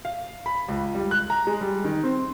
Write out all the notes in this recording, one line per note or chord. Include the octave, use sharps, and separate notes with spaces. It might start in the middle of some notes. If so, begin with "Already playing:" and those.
F5
B5
C#2
G3
F#6
A#5
G#3
G3
D#3
C4